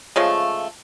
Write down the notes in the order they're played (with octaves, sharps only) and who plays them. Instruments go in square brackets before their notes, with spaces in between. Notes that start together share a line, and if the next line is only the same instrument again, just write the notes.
[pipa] C#3 F3 G#3 A3